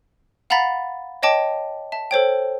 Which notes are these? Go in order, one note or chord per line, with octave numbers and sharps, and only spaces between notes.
F5 F#5 A#5 B5 A6 B6
C#5 D#5 G5 A5 D6
E5 A5
A4 C5 C#5 G5